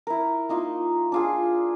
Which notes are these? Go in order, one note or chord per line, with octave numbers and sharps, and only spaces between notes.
E4 A#4
A#3 D#4 F4
D4 F4 G#4